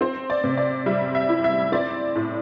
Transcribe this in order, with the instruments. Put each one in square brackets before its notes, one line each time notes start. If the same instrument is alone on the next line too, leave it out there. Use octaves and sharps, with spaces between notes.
[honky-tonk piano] C4 C5
D5
C3
D5
G3 E5
E5
E4
E5
C4 D5
A2